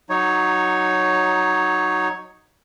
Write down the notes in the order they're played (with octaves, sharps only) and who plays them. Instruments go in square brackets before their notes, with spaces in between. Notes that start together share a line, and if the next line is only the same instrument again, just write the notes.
[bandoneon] F#3 D#4 C#5